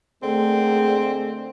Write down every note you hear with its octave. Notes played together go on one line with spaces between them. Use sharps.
D3 A3 A#3 C4 D#4 G#4